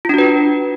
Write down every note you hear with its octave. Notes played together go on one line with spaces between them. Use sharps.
D4 F4 F#4 B4